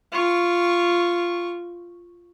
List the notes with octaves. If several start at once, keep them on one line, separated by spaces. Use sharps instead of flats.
F4 C#6